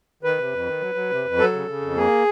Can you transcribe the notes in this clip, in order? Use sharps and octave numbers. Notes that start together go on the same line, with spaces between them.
D#3 B4
C3
F2
D#3
F#3
F#3
C3
F2
F#3 A4
C#3
C#3
F2
A#3 G#4